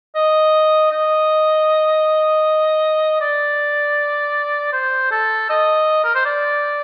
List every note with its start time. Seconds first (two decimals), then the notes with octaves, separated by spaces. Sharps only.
0.15 D#5
0.92 D#5
3.21 D5
4.73 C5
5.11 A4
5.50 D#5
6.04 A#4
6.15 C5
6.25 D5